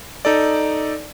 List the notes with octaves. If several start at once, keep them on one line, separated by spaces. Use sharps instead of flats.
D#4 A4 D5